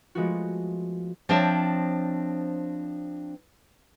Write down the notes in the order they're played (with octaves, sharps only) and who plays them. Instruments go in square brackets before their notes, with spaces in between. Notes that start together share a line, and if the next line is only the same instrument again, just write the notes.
[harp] F3 G#3 A3 B3 F4 F#4
[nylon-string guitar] F3 C4 D4 C5 C#5 E5